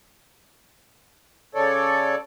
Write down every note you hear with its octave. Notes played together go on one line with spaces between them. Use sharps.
C#3 A4 C#5 D5